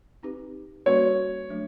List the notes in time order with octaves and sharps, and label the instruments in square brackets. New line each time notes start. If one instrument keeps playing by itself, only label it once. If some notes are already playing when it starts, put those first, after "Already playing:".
[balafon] C4 D#4 G4 B4
[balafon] G3 A#3 C#4 F#4 B4 [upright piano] C#5
[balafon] F#3 A3 D4